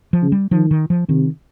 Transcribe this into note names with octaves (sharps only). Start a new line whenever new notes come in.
F3
C#3
G3
D#3 F3
D#3
F3
C3 D#3